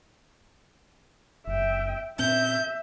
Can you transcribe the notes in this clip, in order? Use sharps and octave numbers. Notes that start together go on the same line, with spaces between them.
F#1 E5 G5
A#2 C4 E5 G6